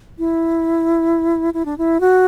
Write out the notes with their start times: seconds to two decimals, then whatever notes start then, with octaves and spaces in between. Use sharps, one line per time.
0.19 E4
1.54 E4
1.65 D4
1.78 E4
2.01 F#4